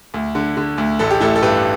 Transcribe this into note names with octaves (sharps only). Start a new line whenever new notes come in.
D2
D3
D3
D2
A1 A4
G4
A1 E4 A4
A4
G2 G4 B4